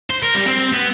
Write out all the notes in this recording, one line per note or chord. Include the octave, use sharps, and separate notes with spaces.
C5
A#4
G3
C4
B3